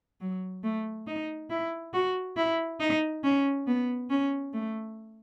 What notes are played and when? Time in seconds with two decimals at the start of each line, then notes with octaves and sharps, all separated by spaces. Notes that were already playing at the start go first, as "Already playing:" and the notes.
0.21 F#3
0.64 A3
1.07 D#4
1.50 E4
1.94 F#4
2.37 E4
2.80 D#4
3.23 C#4
3.67 B3
4.10 C#4
4.54 A3